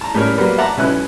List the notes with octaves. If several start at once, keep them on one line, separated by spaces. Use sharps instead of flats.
A5 A#5
A2 G3 C#4 A#4 C#5
F#3 G3 A#3 B3
E5 F#5 A5 A#5 D6
B1 B2 C#4 E4 B4 F#6